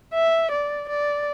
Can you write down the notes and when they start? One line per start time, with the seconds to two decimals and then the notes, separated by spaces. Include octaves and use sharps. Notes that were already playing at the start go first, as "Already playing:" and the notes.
0.14 E5
0.52 D5
0.89 D5